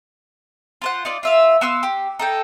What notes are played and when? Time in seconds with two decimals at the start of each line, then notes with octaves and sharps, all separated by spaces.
0.82 F4 C5 F#5
1.05 D#4 F4 D5
1.23 F4 E5 F5
1.61 B3 F5 C6 E6
1.83 G4
2.19 D#4 A4 G5